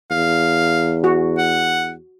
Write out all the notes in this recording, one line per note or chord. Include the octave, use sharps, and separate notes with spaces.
E2 F5
F#4
F#5